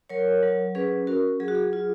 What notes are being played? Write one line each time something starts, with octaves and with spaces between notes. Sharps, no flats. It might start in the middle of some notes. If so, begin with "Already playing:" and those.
F#3 A#4 C#5
F#3
C#4 G#4 B4
C#4 F#4 A#4
F#3 G#4
F#4
G#4
F4